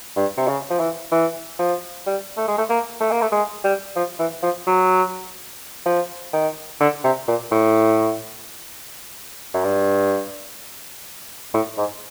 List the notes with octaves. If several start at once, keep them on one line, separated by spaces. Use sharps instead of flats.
G2
C3
C#3
F3
E3
E3
F3
G3
A3
G#3
A3
A#3
A3
A#3
A3
G#3
G3
F3
E3
F3
F#3
F3
D#3
D3
C3
A#2
A2
F#2
G2
A2
G#2